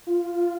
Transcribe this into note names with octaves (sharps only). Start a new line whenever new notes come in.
F4